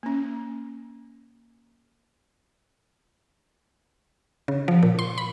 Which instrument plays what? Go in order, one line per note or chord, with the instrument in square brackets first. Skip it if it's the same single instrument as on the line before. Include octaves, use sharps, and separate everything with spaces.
[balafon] A#3 C#4
[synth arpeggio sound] C#3
F3
A#2
C6
B5